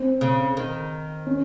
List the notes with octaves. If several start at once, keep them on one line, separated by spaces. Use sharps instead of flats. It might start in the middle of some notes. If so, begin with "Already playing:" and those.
Already playing: C4
C#3
D#3
C#4